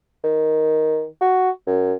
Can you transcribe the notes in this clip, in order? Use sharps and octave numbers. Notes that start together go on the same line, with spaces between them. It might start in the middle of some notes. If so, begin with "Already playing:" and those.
D#3
F#4
F#2